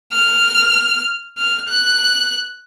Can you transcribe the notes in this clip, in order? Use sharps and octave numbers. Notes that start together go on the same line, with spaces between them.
F6
F6
F#6